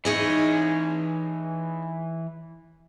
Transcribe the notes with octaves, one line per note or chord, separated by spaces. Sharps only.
E3 D#4 G#4 C#5 D#5